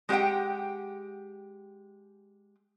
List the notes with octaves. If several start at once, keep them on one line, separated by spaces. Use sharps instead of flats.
G#3 G4 C#5 F#5 G5